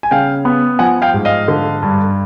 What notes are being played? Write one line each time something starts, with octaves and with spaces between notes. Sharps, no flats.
G#5
C#3 F5 G5
B3
F3 F#5 G#5
F5 G5
G#2
D#5 F5
D3
G2